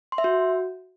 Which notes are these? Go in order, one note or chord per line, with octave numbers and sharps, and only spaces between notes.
C6
E5
F#4